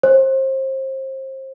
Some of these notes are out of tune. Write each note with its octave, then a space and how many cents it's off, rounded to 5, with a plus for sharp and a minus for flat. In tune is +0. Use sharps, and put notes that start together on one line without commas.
C5 +30